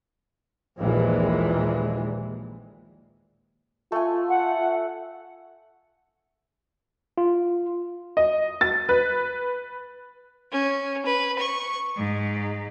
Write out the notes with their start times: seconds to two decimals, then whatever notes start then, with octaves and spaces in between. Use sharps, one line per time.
0.79 A#1 D#2 A#2 E3 G#3
3.92 A3 F4 G#5
4.28 F#5
7.18 F4
8.17 D#5
8.61 A6
8.89 B4
10.52 C#4
11.06 B4
11.39 C#6
11.96 G#2